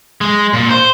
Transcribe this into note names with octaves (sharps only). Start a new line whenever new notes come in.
G#3
A#2
C5